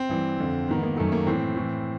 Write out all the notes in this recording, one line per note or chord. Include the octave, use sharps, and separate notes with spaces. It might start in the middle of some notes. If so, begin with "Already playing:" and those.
Already playing: C4
G2 E3
F2 D3
G#2 D#3 B3
A#3
F#2 D#3 A3
A#3
A2 E3 C4
A2 E3